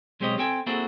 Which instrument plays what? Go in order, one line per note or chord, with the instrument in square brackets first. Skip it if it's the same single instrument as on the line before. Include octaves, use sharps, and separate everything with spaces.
[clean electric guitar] B1 G#3 C4 G4 C#5 D#5
C4 A4 G5 G#5
A#3 C4 E4 F#4 G#4 A4